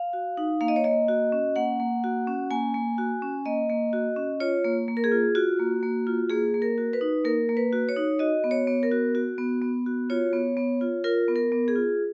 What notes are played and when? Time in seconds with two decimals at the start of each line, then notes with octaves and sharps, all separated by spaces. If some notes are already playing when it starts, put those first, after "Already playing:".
Already playing: F5
0.13 F#4
0.37 D#4
0.61 A#3 F5
0.68 D#5
0.76 C#5
0.84 A#3 D#5
1.09 F#4
1.32 C#4
1.56 A#3 F#5
1.80 A#3
2.04 F#4
2.27 C#4
2.51 A#3 G#5
2.74 A#3
2.98 F#4
3.22 C#4
3.46 A#3 D#5
3.69 A#3
3.93 F#4
4.16 C#4
4.40 F4 C#5
4.65 A#3
4.88 A#3
4.97 A#4
5.04 G#4
5.12 F4
5.35 F4 F#4
5.59 A#3
5.83 A#3
6.07 F4
6.30 A#3 G#4
6.54 A#3
6.62 A#4
6.78 F#4
6.93 B4
7.01 D#4
7.25 A#3 A#4
7.49 A#3
7.57 B4
7.73 F#4
7.89 C#5
7.96 D#4
8.19 F#4 D#5
8.44 B3
8.51 C#5
8.67 B3
8.83 A#4
8.92 F#4
9.15 F#4
9.38 B3
9.62 B3
9.86 F#4
10.10 F4 C#5
10.33 B3
10.57 B3
10.81 F4
11.04 F4 A#4
11.28 B3
11.36 A#4
11.52 B3
11.68 G#4
11.76 F4